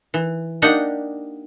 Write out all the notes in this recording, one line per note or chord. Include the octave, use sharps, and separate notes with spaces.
E3
A#3 D4 D#4 G4 D#5 F#5